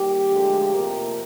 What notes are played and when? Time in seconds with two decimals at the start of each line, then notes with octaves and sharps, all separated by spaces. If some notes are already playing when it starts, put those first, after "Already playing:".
Already playing: D#2 G3 A#3 G4
0.28 D2 D3 F3 G#3
0.72 F2 C3 F3 A#3 A#4